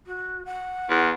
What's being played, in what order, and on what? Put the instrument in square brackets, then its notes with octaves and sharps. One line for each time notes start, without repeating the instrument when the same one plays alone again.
[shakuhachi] F#4
F#5
[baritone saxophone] E2